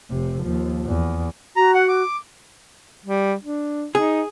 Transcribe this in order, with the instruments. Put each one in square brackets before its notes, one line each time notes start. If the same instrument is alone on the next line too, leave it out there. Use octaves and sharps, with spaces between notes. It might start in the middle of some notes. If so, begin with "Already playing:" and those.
[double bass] F1 C3
D#2 F3
E2
[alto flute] F#4 [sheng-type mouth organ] A#5
[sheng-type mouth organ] F#5
D6
[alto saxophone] G3
D4
[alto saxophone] D#4 [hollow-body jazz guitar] G#4